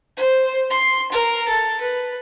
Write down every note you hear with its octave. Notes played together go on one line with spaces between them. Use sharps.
C5
C6
A#4
A4
B4